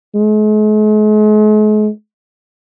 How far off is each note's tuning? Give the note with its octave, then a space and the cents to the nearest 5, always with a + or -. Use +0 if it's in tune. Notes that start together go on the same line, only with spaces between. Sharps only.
G#3 +45